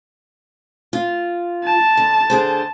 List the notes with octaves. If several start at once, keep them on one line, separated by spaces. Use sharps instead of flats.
F4
A5
D3
D3 G#4 C5